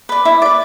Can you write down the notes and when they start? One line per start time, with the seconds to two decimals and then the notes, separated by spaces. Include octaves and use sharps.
0.09 B4 D5
0.25 E4
0.42 B4 D5